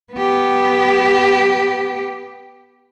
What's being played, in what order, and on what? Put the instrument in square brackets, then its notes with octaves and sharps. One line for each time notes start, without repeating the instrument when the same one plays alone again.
[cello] B3 G4